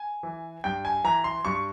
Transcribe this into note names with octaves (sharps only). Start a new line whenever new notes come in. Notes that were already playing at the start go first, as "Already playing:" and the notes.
Already playing: G#5
E3
G2 G5
G#5
E3 A#5
C6
G2 C#6